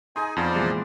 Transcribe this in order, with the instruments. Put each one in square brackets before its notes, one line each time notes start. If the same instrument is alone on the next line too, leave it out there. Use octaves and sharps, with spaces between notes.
[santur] D#4 G#4 D#5 [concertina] G#5 [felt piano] C6
[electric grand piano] F2 [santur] B3 [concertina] F4 C5 D5
[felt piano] A#2 E3 G#3 [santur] D4